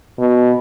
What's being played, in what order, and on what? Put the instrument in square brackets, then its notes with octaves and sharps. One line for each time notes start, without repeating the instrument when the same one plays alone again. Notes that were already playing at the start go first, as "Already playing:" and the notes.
[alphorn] B2